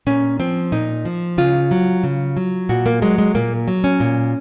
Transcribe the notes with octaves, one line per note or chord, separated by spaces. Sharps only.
A#2 C#4
F3 C4
A#2 D#4
F3
C#3 F4
F#3
C#3
F#3
A#2 F#4
A#3
F#3 G#3
G#3
A#2 A#3
F#3
C#4
A#2